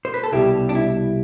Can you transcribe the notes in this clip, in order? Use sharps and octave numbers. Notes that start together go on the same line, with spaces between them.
C5
B4
A4
C2 B2 G3 E4 G4
D4
E4